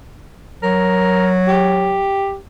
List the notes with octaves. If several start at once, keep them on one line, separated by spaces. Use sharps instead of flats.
F#3 A#4
G4